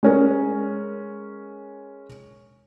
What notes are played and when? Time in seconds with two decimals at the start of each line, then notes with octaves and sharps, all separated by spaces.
0.03 G#3 C#4 A#4